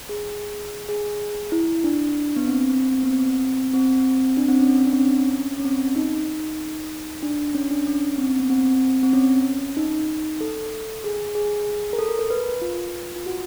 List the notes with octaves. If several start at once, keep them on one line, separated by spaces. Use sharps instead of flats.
G#4
G#4
E4
D4
B3
C4
C4
B3
C4
C4
D4
C4
C#4
C#4
D4
C4
C#4
C#4
C4
D#4
D4
C#4
D4
C#4
C4
B3
C4
C4
C#4
D#4
A4
G#4
G#4
A#4
A4
A#4
A#4
B4
F4
F4
F#4